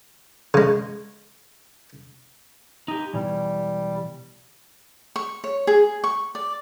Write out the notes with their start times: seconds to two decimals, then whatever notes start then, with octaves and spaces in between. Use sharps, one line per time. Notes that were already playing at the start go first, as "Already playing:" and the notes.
0.54 C#3 G#3
2.88 D#4 G4
3.14 B2 E3 G3
5.16 C#6
5.44 C#5
5.67 G#4
6.04 C#6
6.35 D5